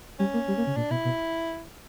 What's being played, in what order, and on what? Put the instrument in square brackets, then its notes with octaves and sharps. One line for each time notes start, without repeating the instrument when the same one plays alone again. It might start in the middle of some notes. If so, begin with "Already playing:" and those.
[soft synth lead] G3 [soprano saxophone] C#4
[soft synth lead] A#3
G3
A#3
C#3
[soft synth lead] A#2 [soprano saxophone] D4
[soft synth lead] B2 [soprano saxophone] E4
[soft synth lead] B2